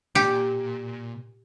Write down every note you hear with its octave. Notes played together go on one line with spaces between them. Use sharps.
A#2 G4